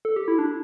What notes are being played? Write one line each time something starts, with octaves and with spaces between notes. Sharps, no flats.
A4
G4
E4
D4